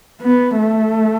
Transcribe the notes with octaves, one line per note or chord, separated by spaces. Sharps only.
B3
A3